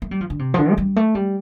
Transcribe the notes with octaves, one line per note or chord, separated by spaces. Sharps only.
A3
G3
F3
D3
C3
F3
D3
A3
G3
A3
G3